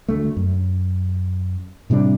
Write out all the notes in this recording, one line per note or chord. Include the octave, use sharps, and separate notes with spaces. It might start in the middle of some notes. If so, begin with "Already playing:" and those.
D2 A3
F#2
A2 C3 G3 D4